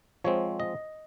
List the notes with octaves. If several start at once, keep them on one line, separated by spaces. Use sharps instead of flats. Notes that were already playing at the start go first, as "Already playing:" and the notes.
F3 G#3 C4 C#5
D#5